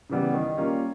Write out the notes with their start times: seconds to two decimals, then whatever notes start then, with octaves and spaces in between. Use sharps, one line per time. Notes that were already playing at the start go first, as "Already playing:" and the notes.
0.10 C#3 E3 G3 B3
0.33 D#3
0.57 G3 A#3 C#4 F4